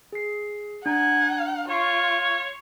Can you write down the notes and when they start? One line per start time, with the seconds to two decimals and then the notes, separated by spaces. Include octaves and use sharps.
0.12 G#4 C7
0.86 D4 F#5 G#5 A#5
1.69 F4 C#5 C6 C#6 C7